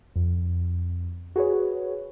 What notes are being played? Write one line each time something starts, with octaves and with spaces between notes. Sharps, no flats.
F2
F#4 G#4 B4 C#5